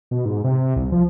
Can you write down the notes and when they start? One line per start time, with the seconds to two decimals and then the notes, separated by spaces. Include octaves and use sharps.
0.11 B2
0.25 G#2
0.44 C3
0.76 C2
0.92 F3